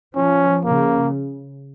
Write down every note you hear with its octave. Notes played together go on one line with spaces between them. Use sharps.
F3 C#4
C#3 A#3